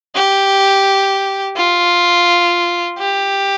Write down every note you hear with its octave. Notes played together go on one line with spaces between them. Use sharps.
G4
F4
G4